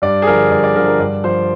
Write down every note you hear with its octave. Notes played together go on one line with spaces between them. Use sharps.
G2 D5
G#4
D3 F3 A#4
G2 D5
D5
D3 F3 A#4
A#4
G2 D5
F3 C5